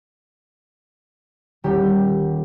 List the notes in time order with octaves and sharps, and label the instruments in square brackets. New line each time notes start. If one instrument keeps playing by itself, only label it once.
[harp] D#1 G4 G5